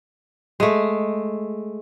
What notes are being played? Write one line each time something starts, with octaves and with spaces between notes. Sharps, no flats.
G#3 A3